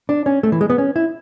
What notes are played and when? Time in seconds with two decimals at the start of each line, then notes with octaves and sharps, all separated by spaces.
0.09 D4
0.26 C#4
0.43 A3
0.52 E3
0.61 G#3
0.70 B3
0.78 C#4
0.96 E4